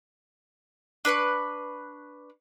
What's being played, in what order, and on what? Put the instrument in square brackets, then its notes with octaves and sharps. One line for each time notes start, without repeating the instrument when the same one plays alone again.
[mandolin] D4 B4 B5 C#6